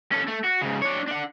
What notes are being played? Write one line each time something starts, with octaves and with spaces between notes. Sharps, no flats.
C#4 A4
A3
F#4
G#2 C#3
D4 C#5
D4 F#5